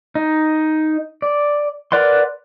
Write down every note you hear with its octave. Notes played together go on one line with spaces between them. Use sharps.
D#4
D5
A#4 B4 D5 F#5 C6